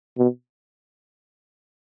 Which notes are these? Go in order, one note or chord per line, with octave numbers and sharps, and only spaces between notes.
B2